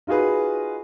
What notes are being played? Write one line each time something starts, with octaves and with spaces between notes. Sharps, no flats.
D#4 F4 F#4 G#4 B4